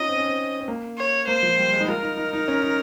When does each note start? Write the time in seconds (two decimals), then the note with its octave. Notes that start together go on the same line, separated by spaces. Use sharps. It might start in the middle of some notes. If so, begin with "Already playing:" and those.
Already playing: C#4 D#4 F4 D#5
0.09 C4
0.18 C#4
0.27 C4
0.61 C4
0.68 A#3
0.98 C#5
1.27 A#3 C5
1.43 F3
1.57 G3
1.73 G#3
1.80 D#4
1.88 F4 A#4
2.03 D#4
2.17 D#4
2.33 D#4
2.48 C#4
2.62 D#4